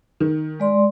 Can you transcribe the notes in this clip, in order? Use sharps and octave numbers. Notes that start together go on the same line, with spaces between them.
D#3
G#3 D5 C6